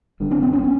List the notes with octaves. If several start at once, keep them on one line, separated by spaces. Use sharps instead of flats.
G1 G2 D3
C4 D4
B3 C#4
B3 C#4
C#4